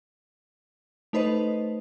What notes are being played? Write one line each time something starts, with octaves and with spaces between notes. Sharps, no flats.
A3 D#4 B4 C5 D#5